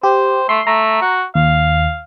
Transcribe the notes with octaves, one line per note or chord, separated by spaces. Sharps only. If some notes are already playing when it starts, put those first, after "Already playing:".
G4 C5
A3 C6
A3 A#5
F#4
D#2 F5